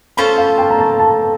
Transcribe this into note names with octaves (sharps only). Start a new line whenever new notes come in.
C#4 F4 A4 C5 B5
F5
G5
A#5
A5
A5